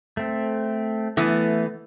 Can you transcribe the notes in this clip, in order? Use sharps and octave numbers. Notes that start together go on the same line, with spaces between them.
A3 C4
E3 A3 B3